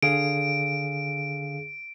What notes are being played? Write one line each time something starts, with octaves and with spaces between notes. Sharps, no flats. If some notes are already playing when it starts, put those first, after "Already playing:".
D3 G#4 F5 D7